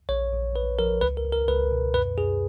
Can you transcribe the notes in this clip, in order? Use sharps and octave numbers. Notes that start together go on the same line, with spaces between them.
A#1 C#5
A#1
A#1 B4
F3 A#4
C#2 B4
A#4
C#2
A#4
C#2 B4
B2
F#2 B4
F#2 G#4